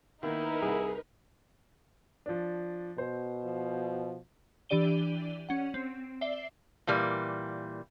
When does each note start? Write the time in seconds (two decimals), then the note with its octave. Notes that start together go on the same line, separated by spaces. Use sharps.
0.23 D#3 A#3 B3 D#4 E4 A#4 B4
0.62 C2 G#4 F#5
2.26 F3 D4
2.98 B2 C5
3.44 F3
4.69 E3 D4 G4 D5 D#7 G7
5.49 C#4 F#5
5.74 C4
6.21 D5 E5 C7 G7
6.87 A#2 E3 G3 A#3